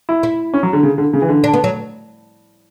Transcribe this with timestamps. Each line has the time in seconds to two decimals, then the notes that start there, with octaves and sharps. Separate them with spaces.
0.09 E4
0.23 E4
0.54 C#4
0.63 F#3
0.73 D3
0.83 C#3
0.98 D3
1.13 C#3
1.22 E3
1.28 D3
1.44 D4
1.53 B3
1.64 F#3